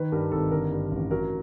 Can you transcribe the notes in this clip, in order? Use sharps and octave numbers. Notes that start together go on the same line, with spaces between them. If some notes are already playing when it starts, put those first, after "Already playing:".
Already playing: D#3 B4
G2 A#4
G#1 A4
D3 A#4
G2
A1
F#3 A#4